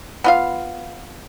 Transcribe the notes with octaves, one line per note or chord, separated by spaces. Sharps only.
B3 F4 F5